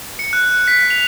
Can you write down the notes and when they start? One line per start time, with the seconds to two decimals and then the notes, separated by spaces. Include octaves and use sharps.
0.19 C#7
0.33 F#6
0.68 B6
0.90 F7